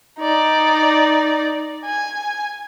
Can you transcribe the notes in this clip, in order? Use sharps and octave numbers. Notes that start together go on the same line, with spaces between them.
D#4 D5
G#5